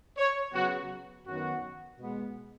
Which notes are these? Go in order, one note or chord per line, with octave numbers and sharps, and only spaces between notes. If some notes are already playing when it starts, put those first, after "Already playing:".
C#5
C#3 F#3 B3 F#4
F#2 D#3 F#3 B3 F#4
B2 G#3 B3